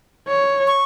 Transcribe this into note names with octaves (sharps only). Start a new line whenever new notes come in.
C#5
C#6